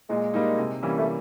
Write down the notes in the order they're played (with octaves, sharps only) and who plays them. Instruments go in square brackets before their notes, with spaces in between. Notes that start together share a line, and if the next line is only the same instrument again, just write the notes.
[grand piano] A#2 [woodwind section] G#3
[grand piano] G3 A#3 D#4
C3
E3 G3 A#3 C#4
[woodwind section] A3